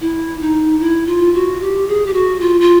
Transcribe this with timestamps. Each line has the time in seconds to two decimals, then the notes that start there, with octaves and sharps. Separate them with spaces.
0.01 E4
0.41 D#4
0.80 E4
1.07 F4
1.34 F#4
1.61 G4
1.88 G#4
2.06 G4
2.13 F#4
2.40 F4
2.61 F4